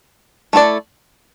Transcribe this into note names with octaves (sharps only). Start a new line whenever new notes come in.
A3 E4 A4 D5